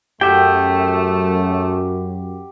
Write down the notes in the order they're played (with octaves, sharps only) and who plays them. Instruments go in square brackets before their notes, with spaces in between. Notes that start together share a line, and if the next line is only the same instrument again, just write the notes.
[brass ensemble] F#2 [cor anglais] A3 [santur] G4 F#5 [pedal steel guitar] E5 G5